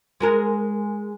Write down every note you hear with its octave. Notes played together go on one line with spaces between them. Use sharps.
G#3 G#4 A#4